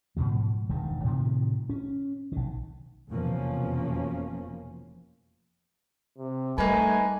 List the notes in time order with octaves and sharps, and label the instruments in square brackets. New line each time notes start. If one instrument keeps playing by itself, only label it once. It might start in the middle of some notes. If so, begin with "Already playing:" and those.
[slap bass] G#2 B2 F3 F#3
E1 G2 D#3
A2 C3 D#3 F3
C#4
B1 D#3
[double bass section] F1 E2 B2 F3 A#3 C#4
[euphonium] C3
[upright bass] G3 [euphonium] A3 [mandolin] A#3 D#4 B4 [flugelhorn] G#5